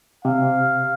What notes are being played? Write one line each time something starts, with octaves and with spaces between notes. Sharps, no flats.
C3 F5